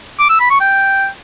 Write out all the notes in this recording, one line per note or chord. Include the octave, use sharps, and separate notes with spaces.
D6
E6
B5
C#6
G5